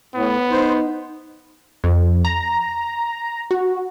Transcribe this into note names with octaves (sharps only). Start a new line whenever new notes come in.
A2 B3
D#4 C5
F2
A#5
F#4